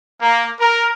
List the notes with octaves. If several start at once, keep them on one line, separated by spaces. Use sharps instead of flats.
A#3
A#4